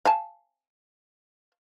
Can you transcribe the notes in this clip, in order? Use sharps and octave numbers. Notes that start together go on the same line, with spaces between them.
F5 G#5 A5